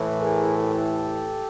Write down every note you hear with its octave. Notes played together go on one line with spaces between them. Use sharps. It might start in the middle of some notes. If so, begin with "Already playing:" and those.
Already playing: A2 E3
G#4 A#4
G4 A4